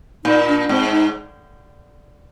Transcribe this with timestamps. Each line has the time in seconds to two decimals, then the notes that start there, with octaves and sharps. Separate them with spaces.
0.25 A#2 D#4
0.48 D4
0.69 G#2 C4
0.91 D#4